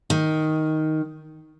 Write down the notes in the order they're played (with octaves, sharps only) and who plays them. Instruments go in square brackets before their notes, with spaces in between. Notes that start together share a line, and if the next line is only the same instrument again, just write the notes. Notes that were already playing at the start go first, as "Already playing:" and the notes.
[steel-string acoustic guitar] D#3